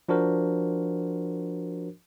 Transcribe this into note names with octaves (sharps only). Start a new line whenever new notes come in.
F3 D4 F#4 A#4 C5